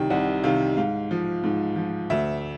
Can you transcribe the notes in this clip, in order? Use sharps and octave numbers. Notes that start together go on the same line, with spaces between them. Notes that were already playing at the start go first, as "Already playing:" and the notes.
Already playing: C2 C3 D#3 G5
C2 F#5
C3 D#3 F5
G#2 F5
F3
G#2
F3
D2 E5